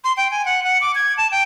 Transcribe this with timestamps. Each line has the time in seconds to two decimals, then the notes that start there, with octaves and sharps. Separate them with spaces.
0.04 C6
0.17 G5
0.31 G#5
0.45 F#5
0.64 F#5
0.81 D6
0.95 G#6
1.17 A5
1.31 G5